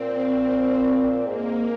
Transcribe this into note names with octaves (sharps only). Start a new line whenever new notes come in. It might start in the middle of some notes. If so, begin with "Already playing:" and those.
Already playing: A#2 C4
G#2 A#3